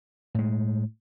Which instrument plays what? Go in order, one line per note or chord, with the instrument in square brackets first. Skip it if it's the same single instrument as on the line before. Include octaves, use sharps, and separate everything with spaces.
[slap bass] A2 G#3